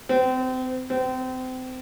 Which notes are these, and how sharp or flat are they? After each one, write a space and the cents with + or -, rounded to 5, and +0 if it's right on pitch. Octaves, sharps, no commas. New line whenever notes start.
C4 -30
C4 -30